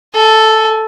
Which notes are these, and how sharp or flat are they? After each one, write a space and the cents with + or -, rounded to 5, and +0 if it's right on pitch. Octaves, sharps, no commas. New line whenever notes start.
A4 +0 G#5 +35